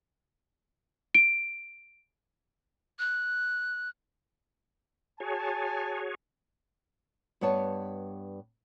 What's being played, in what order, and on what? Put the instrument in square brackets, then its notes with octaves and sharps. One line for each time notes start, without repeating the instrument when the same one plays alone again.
[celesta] D7
[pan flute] F#6
[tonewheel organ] F#4 G#4 C#5 [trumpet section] G#5 A5
[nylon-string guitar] G2 G3 B3 C#5 A5